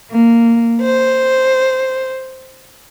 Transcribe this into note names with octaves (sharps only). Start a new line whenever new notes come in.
A#3
C5